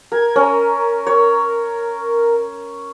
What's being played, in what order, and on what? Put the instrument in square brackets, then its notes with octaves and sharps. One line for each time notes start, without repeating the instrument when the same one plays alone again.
[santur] A#4 [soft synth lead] G#6
[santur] C#4 [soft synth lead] A#4
[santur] C#5